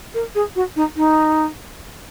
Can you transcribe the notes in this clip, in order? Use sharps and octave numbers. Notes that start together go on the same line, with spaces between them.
A#4
G#4
F#4
D#4
D#4